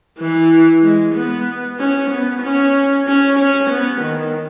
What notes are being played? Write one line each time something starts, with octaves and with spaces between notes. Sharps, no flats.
E3
G#3
B3
C#4
B3
C#4
C#4
C#4
B3
D#3